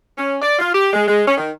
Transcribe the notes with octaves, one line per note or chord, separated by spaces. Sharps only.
C#4
D5
F4
G4
G#3
G#3
C#4
D#3